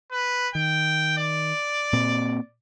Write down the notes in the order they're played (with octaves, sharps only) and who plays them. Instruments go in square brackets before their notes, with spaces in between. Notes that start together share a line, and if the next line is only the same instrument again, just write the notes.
[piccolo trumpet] B4
[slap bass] D#3 [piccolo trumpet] G5
[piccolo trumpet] D5
[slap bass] A#2 C4